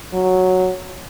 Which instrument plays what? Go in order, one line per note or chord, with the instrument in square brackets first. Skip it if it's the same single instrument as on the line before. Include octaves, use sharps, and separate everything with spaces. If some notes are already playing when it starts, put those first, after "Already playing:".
[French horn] F#3